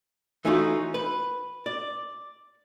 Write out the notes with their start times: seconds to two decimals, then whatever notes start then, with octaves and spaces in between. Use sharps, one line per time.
0.45 E3 A3 C#4 D#4 F4 F#4
0.94 B4
1.66 D5